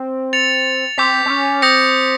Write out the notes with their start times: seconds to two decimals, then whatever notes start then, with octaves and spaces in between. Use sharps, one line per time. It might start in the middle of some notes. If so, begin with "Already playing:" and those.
Already playing: C4
0.33 A6 C#7 F7
0.98 C4 D6 G6 B6
1.26 C4
1.30 C#4
1.62 C4 D#6 G6 A#6 C#7